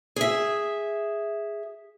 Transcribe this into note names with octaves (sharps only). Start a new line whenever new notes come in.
G#4 E5